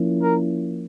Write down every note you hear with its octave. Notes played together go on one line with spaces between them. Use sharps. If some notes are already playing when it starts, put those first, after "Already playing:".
Already playing: F3 A#3 C#4 E4
A#4